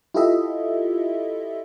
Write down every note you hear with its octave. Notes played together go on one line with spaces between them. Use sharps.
E4 F4 G4 A4 D#5 E5